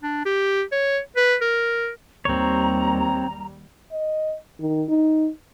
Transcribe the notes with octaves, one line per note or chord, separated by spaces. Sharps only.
D4
G4
C#5
B4
A#4
D#2 G3 C4 C#5 A#5
D#5
D#3
D#4